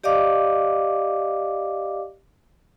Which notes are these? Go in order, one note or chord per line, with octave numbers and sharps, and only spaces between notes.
G4 D5 D#5 F5 D6